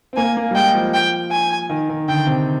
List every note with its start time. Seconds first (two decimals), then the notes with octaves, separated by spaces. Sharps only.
0.13 C4
0.17 A#3 G#5
0.37 A#3
0.51 G3
0.55 G#3 G5
0.75 F3
0.94 G5
1.32 G#5
1.69 D#3
1.89 D#3
2.08 D3 G5
2.27 C3